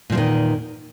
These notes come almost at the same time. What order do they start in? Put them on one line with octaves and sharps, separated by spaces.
A#2 F3 E2 D#3